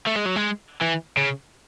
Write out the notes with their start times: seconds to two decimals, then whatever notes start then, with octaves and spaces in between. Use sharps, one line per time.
0.07 A3
0.16 G#3
0.26 F#3
0.36 G#3
0.81 E3
1.17 C#3